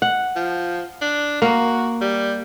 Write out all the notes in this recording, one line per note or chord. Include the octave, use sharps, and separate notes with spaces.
F#5
F3
D4
A#3 F#4
G3